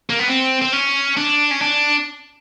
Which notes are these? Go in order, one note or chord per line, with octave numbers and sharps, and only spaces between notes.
A#3
B3
C4
C4
C#4
D4
C#4
D4